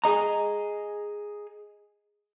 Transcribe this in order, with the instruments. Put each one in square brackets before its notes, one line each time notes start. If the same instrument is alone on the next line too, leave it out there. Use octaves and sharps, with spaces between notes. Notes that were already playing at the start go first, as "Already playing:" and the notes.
[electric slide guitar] G#4 D#5 A#5